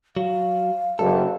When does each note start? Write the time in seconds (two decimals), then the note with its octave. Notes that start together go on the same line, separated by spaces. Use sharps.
0.17 F#3 F5
0.99 F#1 A4